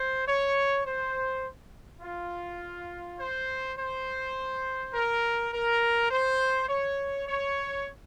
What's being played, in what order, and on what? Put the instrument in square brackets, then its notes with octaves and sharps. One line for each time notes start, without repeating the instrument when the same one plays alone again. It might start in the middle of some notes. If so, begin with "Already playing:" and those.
Already playing: [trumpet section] C5
C#5
C5
F4
C5
C5
A#4
A#4
C5
C#5
C#5